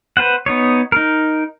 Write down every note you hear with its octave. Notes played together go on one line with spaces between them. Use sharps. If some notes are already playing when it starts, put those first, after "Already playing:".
B4 C5 F#5
B3 D#4 C#5
D#4 A#4